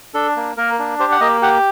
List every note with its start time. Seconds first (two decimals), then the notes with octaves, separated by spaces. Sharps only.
0.14 D4 A4
0.36 A#3
0.57 A#3 A#4
0.79 D4
0.99 G4 C5
1.12 F#5
1.21 A#3 D#5
1.42 G4 F#5